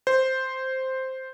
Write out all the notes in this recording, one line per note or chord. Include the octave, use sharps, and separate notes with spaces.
C5